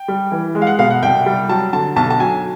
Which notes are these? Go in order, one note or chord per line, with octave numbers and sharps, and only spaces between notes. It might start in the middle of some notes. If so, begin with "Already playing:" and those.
Already playing: G5
G3
E3
G#3
F5
F#5
B2 F5
F#5
C2 G5
G3
F#3 A5
D3 A5
B1 A5
A5
F#3 G#5